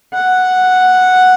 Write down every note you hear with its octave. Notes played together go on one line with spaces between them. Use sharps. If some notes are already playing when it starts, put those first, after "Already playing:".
F#5